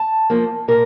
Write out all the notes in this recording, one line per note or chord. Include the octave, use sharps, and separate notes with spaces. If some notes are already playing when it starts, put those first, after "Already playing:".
Already playing: A5
F3 A#3
A#2 A#4